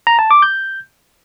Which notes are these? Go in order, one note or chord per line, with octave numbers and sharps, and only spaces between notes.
A#5
A5
D6
G6